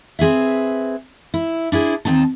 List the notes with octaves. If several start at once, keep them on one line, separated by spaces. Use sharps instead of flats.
C4 G#4 B4 E5
E4
D4 E4 G#4 C5
D#2 C4 D#4 A5